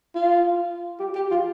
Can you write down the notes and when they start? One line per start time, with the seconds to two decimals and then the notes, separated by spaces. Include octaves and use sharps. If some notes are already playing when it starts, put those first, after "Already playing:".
0.15 F4
1.00 G4
1.15 G4
1.31 F4